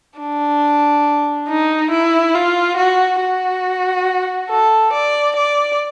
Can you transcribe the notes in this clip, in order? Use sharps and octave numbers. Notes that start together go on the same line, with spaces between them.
D4
D#4
E4
F4
F#4
F#4
A4
D5
D5